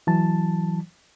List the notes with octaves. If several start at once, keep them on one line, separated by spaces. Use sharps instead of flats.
E3 F#3 A5